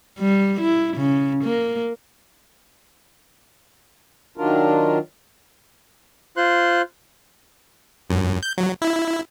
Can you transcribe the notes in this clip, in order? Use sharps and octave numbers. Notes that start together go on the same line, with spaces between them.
G3
E4
C#3
A#3
D#3 F#3 D4 F4 A#4
F4 C5 C6 F#6
F#2
G6
F#3
E4